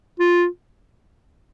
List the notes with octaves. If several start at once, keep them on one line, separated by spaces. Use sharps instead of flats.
F4